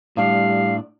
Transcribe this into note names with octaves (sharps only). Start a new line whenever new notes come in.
A2 G3 D4 F5